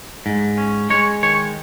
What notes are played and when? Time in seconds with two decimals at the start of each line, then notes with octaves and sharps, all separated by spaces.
0.26 G#2
0.58 C#4
0.90 G#3 C#5
1.23 D#3 C#5